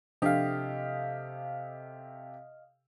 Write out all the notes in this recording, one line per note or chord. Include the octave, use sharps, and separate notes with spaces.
C3 F3 D4 G4 A4 D#5 F5